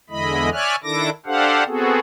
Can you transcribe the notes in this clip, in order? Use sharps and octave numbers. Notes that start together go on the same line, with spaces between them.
E2 D3 G#3 E4 D#5 B5
C#5 D5 E5 G#5 F6 F#6
D#3 D4 E4 A4 D6 A#6
D4 G4 A4 C5 F5 F#5
B3 C4 F#4 G#4 A4